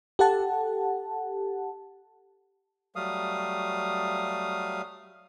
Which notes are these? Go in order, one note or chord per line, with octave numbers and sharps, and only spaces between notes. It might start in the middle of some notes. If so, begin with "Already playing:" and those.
G4 A4 F#5 A5
F#3 G3 A3 F5 D#6